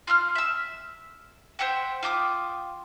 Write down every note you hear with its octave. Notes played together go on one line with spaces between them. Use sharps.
F4 F5 E6 F6
E5 E6
C5 E5 F#5 G5
F4 G5 D6 D#6